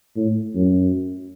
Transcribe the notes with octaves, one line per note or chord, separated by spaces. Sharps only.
A2
F#2